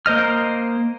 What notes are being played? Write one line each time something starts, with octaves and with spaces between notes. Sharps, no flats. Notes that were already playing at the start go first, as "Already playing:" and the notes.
A#3 C5 D#5 F6